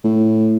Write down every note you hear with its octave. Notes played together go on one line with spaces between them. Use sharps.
A2